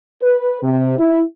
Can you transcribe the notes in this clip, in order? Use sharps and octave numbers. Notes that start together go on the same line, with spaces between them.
B4
C3
E4